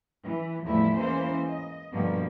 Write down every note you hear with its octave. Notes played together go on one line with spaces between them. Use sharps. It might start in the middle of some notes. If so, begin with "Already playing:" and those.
E3
E2 A2 F3 G3 A3 E4
E3 G#3 A#3 C#4 C5
D#5
G2 B2 D3 F3 A#3